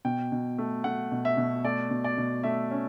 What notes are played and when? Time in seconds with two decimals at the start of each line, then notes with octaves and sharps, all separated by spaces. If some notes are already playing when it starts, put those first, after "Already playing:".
0.05 B2 G5
0.32 B2
0.58 A3
0.84 A3 F#5
1.12 B2
1.25 E5
1.37 B2
1.64 A3 D5
1.91 B2
2.04 D5
2.18 B2
2.44 A3 E5
2.71 C#4